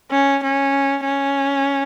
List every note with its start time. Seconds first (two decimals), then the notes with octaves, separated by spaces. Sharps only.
0.11 C#4
0.43 C#4
1.05 C#4